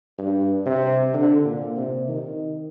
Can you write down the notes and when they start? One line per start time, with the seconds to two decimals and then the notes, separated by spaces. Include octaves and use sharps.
0.18 G2
0.66 C3
1.13 D3
1.45 A#2
1.77 C3
2.08 D#3